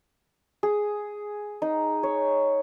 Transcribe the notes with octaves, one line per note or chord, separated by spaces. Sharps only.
G#4
D#4
C#5